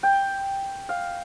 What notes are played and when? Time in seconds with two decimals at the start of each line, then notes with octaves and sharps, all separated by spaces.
0.03 G5
0.89 F5